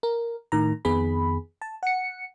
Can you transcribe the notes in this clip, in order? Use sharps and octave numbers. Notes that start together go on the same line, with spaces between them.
A#4
A2 D#3 A#5
F2 D#3 B3 G#4 B5
A5
F#5 C#7